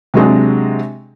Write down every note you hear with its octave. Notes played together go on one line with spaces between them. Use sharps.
C3 F#3 G#3 D4